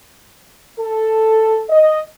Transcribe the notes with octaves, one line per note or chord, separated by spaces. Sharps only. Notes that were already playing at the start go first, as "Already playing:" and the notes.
A4
D#5